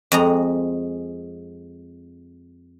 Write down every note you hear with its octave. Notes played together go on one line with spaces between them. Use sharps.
F2 G#3 A#5